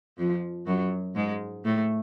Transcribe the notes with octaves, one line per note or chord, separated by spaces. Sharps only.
F2 F3
F#2 F#3
G#2 G#3
A2 A3